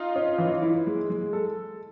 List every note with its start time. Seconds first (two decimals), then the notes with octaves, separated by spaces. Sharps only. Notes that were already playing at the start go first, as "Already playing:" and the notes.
Already playing: D#4 F4
0.16 C#4
0.38 E3
0.62 E4
0.87 G#3
1.10 G#3
1.33 A4